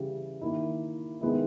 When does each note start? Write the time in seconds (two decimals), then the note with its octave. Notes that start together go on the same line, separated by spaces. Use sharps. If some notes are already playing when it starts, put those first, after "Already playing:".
Already playing: C#3 E3 G3
0.42 D#3 A#3 E4
1.21 D#3 G#3 B3 E4